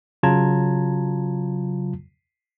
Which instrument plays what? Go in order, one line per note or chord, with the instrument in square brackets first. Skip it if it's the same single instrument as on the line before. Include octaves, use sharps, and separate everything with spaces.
[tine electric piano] C#3 F#3 F4 A5 A#5 G#6